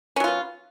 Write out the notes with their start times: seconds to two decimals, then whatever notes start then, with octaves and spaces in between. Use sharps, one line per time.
0.16 C#4
0.20 F#3
0.24 F4
0.28 B3